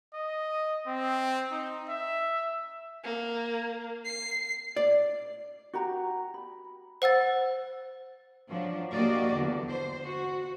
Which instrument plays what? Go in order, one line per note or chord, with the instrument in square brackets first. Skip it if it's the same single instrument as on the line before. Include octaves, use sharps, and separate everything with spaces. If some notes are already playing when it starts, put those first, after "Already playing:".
[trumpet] D#5
C4
D#4
E5
[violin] A#3
C7
[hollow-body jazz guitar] D5
[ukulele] F#4 G4 G5 A#5
B5
[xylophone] C5 F#5 E6 A6
[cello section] F3 F#3 D4
F3 A#3 F#4 G4 D5 D#5
E2 D3
C5
F#4